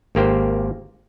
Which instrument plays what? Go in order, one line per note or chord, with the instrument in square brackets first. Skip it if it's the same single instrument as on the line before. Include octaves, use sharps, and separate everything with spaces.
[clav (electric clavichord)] G#1 A#3 G4 C5